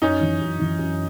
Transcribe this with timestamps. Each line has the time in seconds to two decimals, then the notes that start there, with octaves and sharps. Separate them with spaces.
0.02 F#2 C#4 D#4
0.21 E3
0.41 F#2
0.59 E3
0.79 F#2